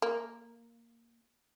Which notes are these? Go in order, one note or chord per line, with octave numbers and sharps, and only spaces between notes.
A#3